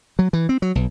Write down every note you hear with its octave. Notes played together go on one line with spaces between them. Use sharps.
F#3
E3
C4
F#3
B1